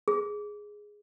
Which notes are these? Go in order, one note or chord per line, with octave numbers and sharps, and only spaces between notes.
G#4